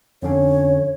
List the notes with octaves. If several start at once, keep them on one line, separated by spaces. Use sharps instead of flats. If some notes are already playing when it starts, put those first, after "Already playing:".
F2 D3 C#4 C#5